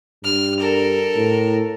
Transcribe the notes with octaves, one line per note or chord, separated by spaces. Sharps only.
G2 F6
A4 A#4
A2